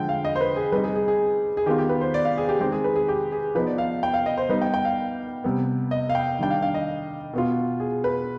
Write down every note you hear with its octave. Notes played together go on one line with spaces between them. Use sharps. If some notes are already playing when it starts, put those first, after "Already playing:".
Already playing: D3 F3 G#3 G5
F5
D#5
C5
B4
G#4
G3 C4 D#4 B4
G#4
G#4
G#4
G#4
D#3 B3 F4 G4
G4
B4
C5
D5
F5
G#4
G4
D#3 G#3 C4 G4
G#4
B4
G#4
G4
G#4
F3 B3 D#4 B4
D5
F5
G5
F5
D#5
C5
G3 B3 D#4 B4
G5
G5
F5
C3 G3 B3
D#5
F5
G5
D#3 G3 D4 G5
F5
F5
D#5
B2 B3 F4
G#4
B4